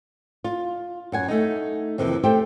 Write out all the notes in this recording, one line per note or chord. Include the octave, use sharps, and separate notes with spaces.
F4
F#2 F#5 G#5
A3 D#4
F2 C3 D#3 E3 A#3
A3 G4 C5 G5